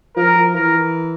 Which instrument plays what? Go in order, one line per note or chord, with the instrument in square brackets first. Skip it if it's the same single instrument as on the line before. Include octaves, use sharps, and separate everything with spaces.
[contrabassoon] F3 [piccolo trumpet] A#4
[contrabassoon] F3
[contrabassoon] E3 [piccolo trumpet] A#4